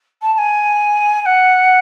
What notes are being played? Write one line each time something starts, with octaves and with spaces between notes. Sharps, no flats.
A5
A5
G#5
G#5
F#5